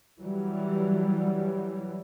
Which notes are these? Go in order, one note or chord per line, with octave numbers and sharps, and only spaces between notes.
E3 F#3 G3